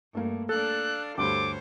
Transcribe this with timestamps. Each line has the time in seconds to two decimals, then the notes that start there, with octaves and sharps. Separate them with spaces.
0.15 G2 A3 A#3
0.49 D4 A4 F5 F#6
1.17 D2 G2 C5 C#5 D6